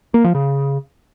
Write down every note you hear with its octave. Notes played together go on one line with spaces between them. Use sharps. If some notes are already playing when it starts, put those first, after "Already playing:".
A#3
F3
C#3